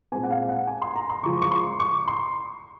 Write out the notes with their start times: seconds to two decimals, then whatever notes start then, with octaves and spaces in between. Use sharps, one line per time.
0.12 A#2 G#3 C4 G#5
0.23 F#5
0.30 F5
0.49 F#5
0.67 G#5
0.82 C6
0.96 A#5
1.09 C6
1.23 C#3 F3 G#3 C#6
1.42 C#6
1.51 C6
1.80 C#6
2.07 C6